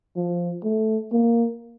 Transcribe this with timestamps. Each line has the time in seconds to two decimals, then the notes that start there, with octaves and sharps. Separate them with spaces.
0.16 F3
0.64 A3
1.13 A#3